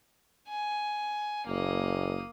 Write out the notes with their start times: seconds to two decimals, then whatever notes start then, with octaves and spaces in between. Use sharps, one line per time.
0.49 G#5
1.47 F#1 A#3 D#6